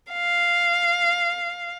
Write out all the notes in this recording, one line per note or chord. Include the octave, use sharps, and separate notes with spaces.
F5